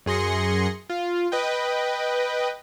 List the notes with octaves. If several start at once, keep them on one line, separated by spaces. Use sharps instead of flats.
F#2 G#4 C6 A#6 C#7
F4
B4 D#5 G5